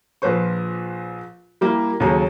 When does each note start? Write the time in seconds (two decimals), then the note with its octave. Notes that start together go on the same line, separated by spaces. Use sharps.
0.22 A#1 F3 B4 C5 C#6
1.61 G3 A#3 E4
2.00 D#2 C#3 F#3 G#4 A4 A#5